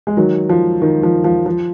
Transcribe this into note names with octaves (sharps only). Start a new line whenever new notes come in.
G#3
D#3 F#3
F3
D#3
F3
F3
F3